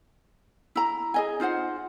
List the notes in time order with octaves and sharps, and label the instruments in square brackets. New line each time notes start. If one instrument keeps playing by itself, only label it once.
[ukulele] E4 A#5
G#4 D#5 G#5
D#4 F4 C5 F#5